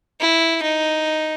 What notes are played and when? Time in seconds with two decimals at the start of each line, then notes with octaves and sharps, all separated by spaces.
0.20 E4
0.63 D#4